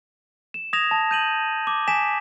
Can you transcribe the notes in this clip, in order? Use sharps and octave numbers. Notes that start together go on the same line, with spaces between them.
E7
D#6 G#6 A#6 E7 F7
A5
G6 D#7 F#7
D6
G#5 B6 E7